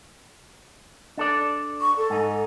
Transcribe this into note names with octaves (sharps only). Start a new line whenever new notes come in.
D4 A4 D5
C#6
A4
G#2 D#4